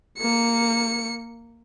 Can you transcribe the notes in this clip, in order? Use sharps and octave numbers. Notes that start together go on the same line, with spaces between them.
A#3 C#7